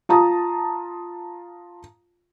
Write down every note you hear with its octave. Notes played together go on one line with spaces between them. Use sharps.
F4 A5 A#5 D#6